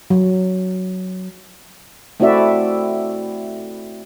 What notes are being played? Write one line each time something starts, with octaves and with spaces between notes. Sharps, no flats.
F#3
A3 C4 E4 F#4 D5 E5